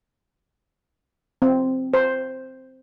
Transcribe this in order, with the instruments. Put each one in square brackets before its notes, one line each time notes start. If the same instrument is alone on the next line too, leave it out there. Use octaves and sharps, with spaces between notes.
[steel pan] C4
C5